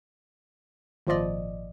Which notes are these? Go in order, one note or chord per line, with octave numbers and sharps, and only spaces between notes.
G#1 A#2 F3 F4 D5 D#5